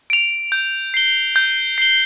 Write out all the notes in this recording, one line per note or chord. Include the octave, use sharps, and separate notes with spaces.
D7 F7
G6
C7 G7
G6
C7 G7